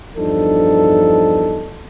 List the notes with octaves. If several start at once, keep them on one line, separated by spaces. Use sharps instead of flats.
E2 G2 F3 D4 D#4 A4